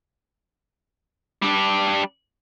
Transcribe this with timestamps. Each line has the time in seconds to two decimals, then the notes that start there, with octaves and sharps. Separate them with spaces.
1.42 G3 D4